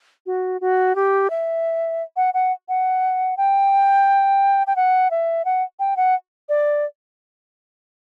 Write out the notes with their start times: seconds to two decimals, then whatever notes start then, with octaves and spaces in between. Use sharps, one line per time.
0.26 F#4
0.61 F#4
0.96 G4
1.30 E5
2.16 F#5
2.34 F#5
2.69 F#5
3.37 G5
4.67 G5
4.76 F#5
5.11 E5
5.45 F#5
5.79 G5
5.97 F#5
6.49 D5